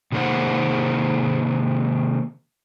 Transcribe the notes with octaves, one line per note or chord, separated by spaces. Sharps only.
C3 D#3 G#3 A#3 C5 F#5